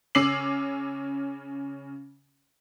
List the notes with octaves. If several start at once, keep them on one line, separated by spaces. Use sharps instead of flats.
C#3 C#4 D6 E6 C7 F#7